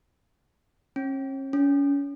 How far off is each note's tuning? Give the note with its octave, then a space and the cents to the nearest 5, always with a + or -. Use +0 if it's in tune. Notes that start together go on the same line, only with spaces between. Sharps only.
C#4 -40
C#4 +30